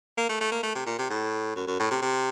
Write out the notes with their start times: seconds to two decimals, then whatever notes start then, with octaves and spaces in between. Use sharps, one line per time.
0.17 A#3
0.29 A3
0.40 A3
0.52 A#3
0.63 A3
0.75 C3
0.86 A#2
0.98 C3
1.10 A2
1.56 F#2
1.67 F#2
1.79 A2
1.90 C3
2.02 C3